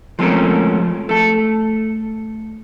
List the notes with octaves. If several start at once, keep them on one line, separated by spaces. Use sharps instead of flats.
F3 G#3 A3 C4 C#4 A#4
A3 A4